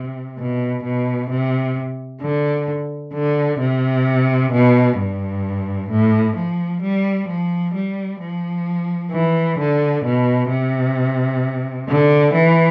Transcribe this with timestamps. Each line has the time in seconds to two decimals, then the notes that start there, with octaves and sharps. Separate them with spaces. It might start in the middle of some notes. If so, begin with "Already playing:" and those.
Already playing: C3
0.38 B2
0.84 B2
1.30 C3
2.22 D3
3.14 D3
3.59 C3
4.52 B2
4.98 G2
5.90 A2
6.36 F3
6.82 G3
7.28 F3
7.75 G3
8.20 F3
9.12 E3
9.58 D3
10.04 B2
10.50 C3
11.88 D3
12.34 E3